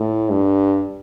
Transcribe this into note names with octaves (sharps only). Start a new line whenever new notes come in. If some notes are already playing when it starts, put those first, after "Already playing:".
Already playing: A2
G2